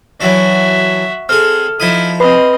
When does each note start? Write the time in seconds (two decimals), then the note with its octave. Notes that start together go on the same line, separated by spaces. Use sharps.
0.21 E3 F#3 D4 F#4 E5
1.29 C4 G#4 A4 F6
1.80 F3 D#4 E4 D#6
2.20 C4 B4 D#5 B5